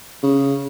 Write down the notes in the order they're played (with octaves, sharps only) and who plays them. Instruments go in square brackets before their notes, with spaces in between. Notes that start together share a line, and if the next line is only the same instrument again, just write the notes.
[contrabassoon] C#3